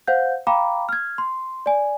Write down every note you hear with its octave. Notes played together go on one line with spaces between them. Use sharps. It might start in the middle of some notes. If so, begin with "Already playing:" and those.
C5 F5 F#5 G6
F5 G5 A#5 B5 D6
F6 G#6
C6
D5 G#5